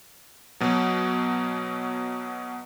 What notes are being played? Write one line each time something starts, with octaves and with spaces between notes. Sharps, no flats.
B2 F#3